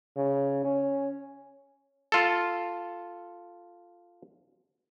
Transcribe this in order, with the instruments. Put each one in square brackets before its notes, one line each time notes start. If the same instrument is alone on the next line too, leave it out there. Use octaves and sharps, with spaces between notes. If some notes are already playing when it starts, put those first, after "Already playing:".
[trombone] C#3
C#4
[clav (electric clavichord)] F4 A4